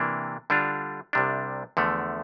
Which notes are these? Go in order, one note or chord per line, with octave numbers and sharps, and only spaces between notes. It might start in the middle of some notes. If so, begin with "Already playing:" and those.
Already playing: C3 E3 A#3 D4
D3 G3 D4 F4
C2 C3 G3 D4
E2 D3 F3 A3